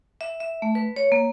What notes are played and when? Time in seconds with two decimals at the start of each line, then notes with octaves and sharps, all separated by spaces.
0.21 E5
0.40 E5
0.62 A3
0.75 B4
0.96 C#5
1.12 A#3